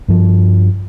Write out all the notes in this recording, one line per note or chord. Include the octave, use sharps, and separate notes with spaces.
G2 F3